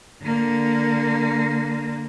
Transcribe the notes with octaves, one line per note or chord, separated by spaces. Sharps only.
D3 A#3